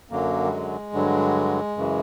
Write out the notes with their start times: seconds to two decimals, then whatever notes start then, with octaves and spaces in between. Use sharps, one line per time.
0.10 F#2 D3 F#3 A#3
0.47 G3
0.51 G#3
0.93 G2 D3 F#3
1.77 F#2 C#3 E3